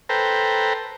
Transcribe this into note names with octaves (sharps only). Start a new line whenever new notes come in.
A4 B4 C5 G5 A#5